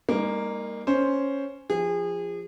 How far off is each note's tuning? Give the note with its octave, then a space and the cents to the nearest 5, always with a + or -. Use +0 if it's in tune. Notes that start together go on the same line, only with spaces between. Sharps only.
G3 +45 A#3 -5 D#4 +10
C#4 +0 C5 +0
F3 +0 G#4 -30